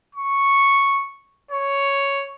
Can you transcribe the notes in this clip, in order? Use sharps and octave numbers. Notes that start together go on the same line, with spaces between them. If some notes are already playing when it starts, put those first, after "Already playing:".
C#6
C#5